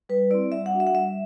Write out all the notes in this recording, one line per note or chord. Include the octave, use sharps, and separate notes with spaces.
G3 B4
C4 E4 D5
G3 E5
F#5
D4 F#4
E5
F#5
G3 E5